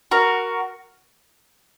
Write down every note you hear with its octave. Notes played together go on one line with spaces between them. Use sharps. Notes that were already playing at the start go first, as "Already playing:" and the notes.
F#4 A#4